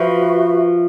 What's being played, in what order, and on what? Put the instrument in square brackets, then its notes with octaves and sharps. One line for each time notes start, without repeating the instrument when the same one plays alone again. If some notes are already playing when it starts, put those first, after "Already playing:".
Already playing: [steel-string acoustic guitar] F3 [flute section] F#4 B4 E5